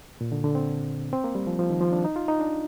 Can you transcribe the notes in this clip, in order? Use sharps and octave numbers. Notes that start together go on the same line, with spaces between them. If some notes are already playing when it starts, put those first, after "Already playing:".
A#2
D3
D3
C4
C4
A#3
G3
F3
F3
D#3
F3
D4
D#4
F4
D#4
D4